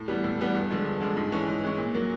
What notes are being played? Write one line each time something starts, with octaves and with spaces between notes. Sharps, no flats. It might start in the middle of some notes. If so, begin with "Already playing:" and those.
Already playing: A2
E3 G3 B3
A2
E3 G3 B3
G2
D3 F3 G#3
G2
D3 F3 G#3
G#2
E3 G#3 C#4
G#2
E3 G#3 C#4
A#2
F#3 A#3